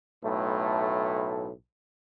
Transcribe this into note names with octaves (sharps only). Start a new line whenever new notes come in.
B1 A2 A3